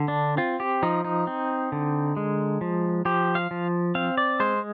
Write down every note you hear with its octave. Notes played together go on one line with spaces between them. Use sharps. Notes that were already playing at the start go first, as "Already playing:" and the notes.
Already playing: D3
D4
C4 F4
G4
F3 D#4
D#4
C4
D3
G#3
F3
F3 G4
F5
F3
C4 F5
D5
G#3 C5